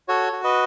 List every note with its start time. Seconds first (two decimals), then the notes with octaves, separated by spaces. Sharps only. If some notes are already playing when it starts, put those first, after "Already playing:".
0.08 F#4 A4 C#5
0.33 F#4
0.44 B4 D#5